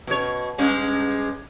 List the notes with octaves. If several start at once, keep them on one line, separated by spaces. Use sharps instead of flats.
B2 C#5
G2 G#3 C#4